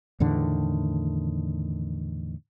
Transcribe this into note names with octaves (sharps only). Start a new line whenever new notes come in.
E2 A2 D3 D#3